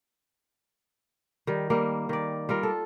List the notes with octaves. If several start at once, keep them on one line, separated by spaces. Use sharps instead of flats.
D#3 G3
G3 A#3
D#3 D5
G3 F4 A#4
A4